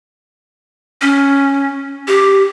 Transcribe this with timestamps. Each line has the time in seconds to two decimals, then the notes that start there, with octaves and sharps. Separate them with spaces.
1.02 C#4
2.08 G4